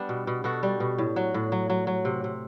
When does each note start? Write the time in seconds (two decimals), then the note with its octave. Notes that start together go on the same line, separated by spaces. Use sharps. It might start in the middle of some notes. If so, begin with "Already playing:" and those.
Already playing: G3 B3 D4
0.09 B2
0.27 B2
0.44 B2 F#4 A4
0.63 G3
0.80 B2
0.98 A2
1.16 F#3
1.34 A2
1.52 F#3
1.70 F#3
1.87 F#3
2.05 C3
2.24 C3